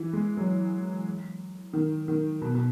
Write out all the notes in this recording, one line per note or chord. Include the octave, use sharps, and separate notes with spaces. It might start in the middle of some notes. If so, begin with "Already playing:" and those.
Already playing: E3
G#3
F#3
D#3
D#3
B2
B2